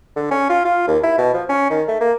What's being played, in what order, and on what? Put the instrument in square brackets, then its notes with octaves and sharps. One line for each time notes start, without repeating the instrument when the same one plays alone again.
[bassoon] D3
C#4
F4
F4
D#2
E4
B2
F3
C#4
D#3
A3
A#3